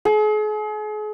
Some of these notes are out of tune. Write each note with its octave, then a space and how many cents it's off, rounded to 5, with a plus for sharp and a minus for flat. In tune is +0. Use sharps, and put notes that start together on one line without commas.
G#4 +40